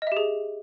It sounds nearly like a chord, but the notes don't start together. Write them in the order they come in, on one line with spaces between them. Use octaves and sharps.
D#5 E5 G4 G#4